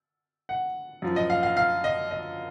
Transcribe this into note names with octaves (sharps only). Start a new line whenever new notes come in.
F#5
F#2 F3
D#5
F5
F5
F5
D#5
D#5